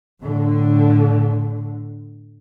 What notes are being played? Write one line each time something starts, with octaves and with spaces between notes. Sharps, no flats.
A2 D3